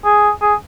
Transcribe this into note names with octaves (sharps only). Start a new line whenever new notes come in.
G#4
G#4